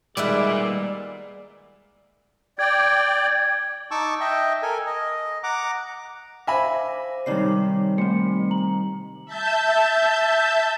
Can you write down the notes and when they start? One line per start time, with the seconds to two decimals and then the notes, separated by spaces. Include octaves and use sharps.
0.17 D#3 G3 G#3 A#3 B4 D5 E5 F#5
2.59 D5 G5 G#6
3.91 D#4 A5 C#6 D6 E6
4.20 D#5 E5 G5
4.62 A4 A#4 G#5
4.86 D#5
5.43 F#5 A#5 D6
6.47 C5 E5 F5 G#5 B5 D6 A#6
7.26 C3 D#3 G3 D#4 C#5 D5 C7
7.98 A3 C4 C5 C#7
8.51 A#5 F#7
9.26 E5 A5 G6